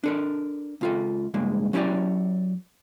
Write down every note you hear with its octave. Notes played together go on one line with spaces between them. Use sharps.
D4 A4 A#4
C#2 F4 A4
C#2 G2 G#3 A#3
F#3 C#4 E4 G4 C#5 D5